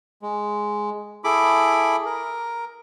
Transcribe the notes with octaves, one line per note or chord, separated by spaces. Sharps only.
G#3
E4 G#4 A4 B5 D6
A#4